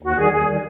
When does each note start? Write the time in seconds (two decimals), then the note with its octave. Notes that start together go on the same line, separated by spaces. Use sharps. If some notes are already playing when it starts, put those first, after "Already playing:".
0.02 D#2 F#4
0.17 D#3 G3 G#4
0.32 D#2 G#4
0.47 D#3 G3